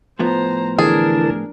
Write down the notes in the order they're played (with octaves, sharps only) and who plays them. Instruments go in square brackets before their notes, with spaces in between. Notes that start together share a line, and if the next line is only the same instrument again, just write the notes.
[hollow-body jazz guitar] A2 F3 B3 [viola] C5 A#5
[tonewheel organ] D3 E3 A5 [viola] D4 A#4 [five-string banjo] G#4